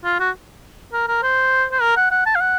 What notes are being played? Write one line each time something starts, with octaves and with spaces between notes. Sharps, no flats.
F4
F#4
A#4
A#4
C5
C5
A#4
F#5
F#5
A5
F5
F#5